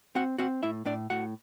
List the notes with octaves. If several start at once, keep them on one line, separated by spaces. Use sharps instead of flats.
C4 F#4 F#5
C4 F#4 F#5
A2 E4 E5
A2 D4 D5
A2 F#4 F#5